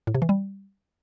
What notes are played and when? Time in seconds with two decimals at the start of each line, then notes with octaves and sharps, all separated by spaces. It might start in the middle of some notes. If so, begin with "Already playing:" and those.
0.07 A2
0.15 C3
0.22 E3
0.29 G3